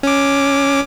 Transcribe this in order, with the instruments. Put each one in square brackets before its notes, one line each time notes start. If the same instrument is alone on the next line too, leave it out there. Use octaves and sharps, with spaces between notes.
[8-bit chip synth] C#4 D6